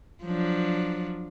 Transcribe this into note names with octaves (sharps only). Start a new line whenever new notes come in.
F3 F#3 D4